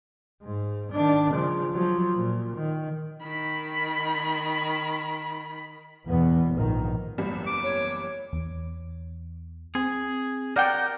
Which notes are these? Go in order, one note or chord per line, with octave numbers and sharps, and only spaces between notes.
G#2
D#3 D4
C#3 F3
F3 F#3
A#2
D#3
D#3 B5
E2 B2 B3
A#1 G#2 D#3
F#1 E2 G3
D6
C#5
E2
C4 G#4
A#4 D5 F#5 G5 G6